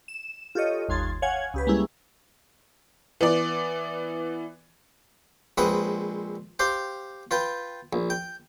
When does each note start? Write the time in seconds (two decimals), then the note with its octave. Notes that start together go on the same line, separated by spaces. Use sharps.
0.08 E7
0.55 F4 G4 A4 C#5 D#5
0.89 G1 D#2 C6 G#6 A6
1.22 C#5 F5 F#5 G#5 G#6
1.54 C#2 G4 B4
1.67 G3 G#3 A#3 C#4 E4 G#4
3.21 E3 B3 D5
5.58 A#1 G#3 C4 B4 F#5 D#6
6.59 G4 C5 F5 G5
7.31 F4 B4 G5
7.93 A#1
8.10 G5